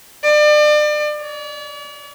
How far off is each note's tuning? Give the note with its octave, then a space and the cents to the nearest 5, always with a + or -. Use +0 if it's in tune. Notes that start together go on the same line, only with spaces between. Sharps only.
D5 +35
D5 -45